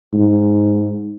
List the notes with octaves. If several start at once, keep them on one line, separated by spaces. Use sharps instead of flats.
G#2